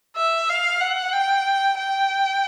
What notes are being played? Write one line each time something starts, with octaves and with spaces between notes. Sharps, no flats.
E5
F5
F#5
G5
G5